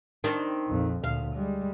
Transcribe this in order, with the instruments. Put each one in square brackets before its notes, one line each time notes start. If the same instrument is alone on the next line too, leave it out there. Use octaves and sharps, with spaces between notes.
[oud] D#3 C4 D4
[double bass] A#1 F2
[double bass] D2 A#2 [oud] F5
[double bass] G3 G#3